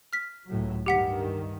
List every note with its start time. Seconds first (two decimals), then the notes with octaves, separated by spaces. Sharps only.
0.13 F6 B6
0.49 C#2 A2 F#3
0.86 G2 D#3 G4 F#5 B6